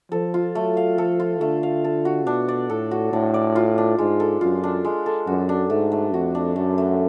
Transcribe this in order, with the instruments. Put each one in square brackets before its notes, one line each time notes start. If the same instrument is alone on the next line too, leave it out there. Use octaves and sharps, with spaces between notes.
[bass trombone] F3 [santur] A4
[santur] F4
[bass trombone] F#3 [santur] A3
[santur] F5
[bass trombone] F3 [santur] A4
[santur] F4
[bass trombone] D3 [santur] A3
[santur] F5
A4
F#4
[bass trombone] B2 [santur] D4
[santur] D5
[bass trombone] A2 [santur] A4
[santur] F#4
[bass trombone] A2 [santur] D4
[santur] D5
F4
D4
[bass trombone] G#2 [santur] G#3
[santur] A4
[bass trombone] F#2 [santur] F4
[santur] D4
G#3
A4
[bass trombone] F#2 [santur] F#4
[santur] D4
[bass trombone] G#2 [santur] A3
[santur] A3
[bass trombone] F2 [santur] F#4
[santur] D4
[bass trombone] F#2 [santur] A3
[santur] A3